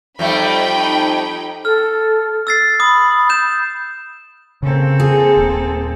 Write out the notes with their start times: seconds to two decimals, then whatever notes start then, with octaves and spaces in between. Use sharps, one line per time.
0.19 F2 G3 A3 D#4 G5 B5
1.65 A4 F6
2.47 E6 A6 C7
2.80 B5 D#6
3.29 G6 E7
4.63 C#3 A#3 C4 A4
5.00 G#4
5.37 D#1